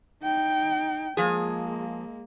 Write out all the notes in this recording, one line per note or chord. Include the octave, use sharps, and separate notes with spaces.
D#4 G5
F3 G#3 A#3 G#4